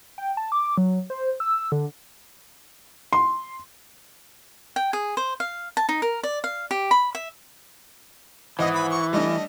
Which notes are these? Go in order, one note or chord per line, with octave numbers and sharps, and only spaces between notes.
G5
A5
D6
F#3
C5
E6
D3
C6
G5
G#4
C5
F5
A5
D#4
A#4
D5
F5
G4
B5
E5
G#1 E3 D#5 F#5 D#6
B5
C#6
G3 A3 D4 D#5